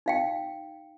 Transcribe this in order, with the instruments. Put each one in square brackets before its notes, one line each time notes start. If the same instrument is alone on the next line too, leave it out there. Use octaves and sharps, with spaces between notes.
[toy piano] D#4 F5 G5